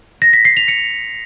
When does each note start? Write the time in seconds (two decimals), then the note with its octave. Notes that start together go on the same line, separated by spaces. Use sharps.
0.22 A#6
0.33 B6
0.45 C7
0.57 F7
0.68 C#7